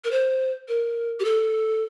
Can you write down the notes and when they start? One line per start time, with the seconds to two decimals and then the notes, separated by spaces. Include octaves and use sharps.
0.04 A#4
0.11 C5
0.68 A#4
1.20 G4
1.25 A4